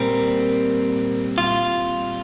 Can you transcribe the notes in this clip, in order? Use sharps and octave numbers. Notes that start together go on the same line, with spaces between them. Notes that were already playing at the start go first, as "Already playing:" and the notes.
Already playing: A#2 G3 C4 A#4
F4